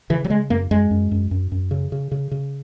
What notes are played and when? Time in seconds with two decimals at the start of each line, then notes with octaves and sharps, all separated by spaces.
0.10 C#3 E3
0.24 F#3
0.30 C#3 G#3
0.50 F#2 A#3
0.71 F#2 G#3
0.91 F#2
1.11 F#2
1.31 F#2
1.52 F#2
1.71 C#3
1.92 C#3
2.12 C#3
2.31 C#3